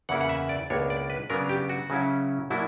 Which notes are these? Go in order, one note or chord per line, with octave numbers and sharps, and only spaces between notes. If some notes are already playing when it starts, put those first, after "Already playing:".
E2 C#3 E3 A#3 E4 F#5
F#5
E5
D5
C#2 B2 A#3 D4 C#5
D5
B4
C#3 F#3 B3 D4 A#4
G4
F#4
C#3 F#3 C#4 E4
B2 F#3 A#3 D4 E4